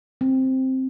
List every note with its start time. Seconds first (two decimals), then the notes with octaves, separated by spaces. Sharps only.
0.21 C4